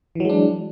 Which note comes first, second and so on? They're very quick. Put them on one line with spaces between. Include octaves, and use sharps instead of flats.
E3 F#3 G#3 D4